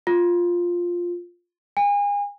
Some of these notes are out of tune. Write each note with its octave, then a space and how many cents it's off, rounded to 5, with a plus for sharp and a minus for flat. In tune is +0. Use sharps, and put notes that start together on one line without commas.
F4 +5
G#5 -35